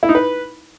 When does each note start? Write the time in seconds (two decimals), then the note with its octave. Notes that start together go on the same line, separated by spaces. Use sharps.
0.03 E4
0.09 D#4
0.15 B4